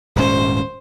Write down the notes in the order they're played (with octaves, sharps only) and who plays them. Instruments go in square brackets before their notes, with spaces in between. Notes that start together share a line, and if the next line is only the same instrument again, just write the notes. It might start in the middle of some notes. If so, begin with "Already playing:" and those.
[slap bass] D#1 G#2 C#4 [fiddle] C5